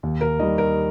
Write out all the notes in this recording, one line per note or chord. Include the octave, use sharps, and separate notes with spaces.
D#2
A#4
D#3 G3 D#5
A#4